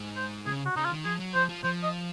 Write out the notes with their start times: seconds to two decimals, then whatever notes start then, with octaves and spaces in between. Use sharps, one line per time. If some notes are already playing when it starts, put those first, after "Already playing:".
Already playing: G#2
0.17 C5
0.46 C#3 G#4
0.66 F#4
0.76 C#3 D#4
0.85 F4
0.90 D#3
1.05 F3 G#4
1.19 F#3
1.35 F3 C5
1.49 F3
1.64 F3 C5
1.83 D#5